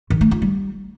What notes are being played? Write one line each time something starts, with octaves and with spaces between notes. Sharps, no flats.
D#3
A3
F4
G3